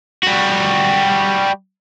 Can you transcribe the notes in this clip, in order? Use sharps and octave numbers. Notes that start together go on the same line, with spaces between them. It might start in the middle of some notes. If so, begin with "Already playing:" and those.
G3 F#4